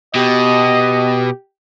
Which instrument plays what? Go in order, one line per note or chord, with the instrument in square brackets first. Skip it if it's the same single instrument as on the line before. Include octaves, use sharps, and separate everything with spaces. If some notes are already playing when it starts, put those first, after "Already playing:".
[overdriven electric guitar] B2 [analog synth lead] G4 [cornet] D#5